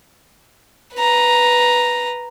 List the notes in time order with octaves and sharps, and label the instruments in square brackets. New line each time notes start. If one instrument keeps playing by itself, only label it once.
[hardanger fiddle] B4 A#5